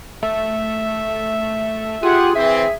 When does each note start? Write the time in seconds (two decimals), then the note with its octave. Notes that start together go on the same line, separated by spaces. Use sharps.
0.23 A3 E5
2.03 F4 G4 G#4 F#5
2.35 E3 C4 E5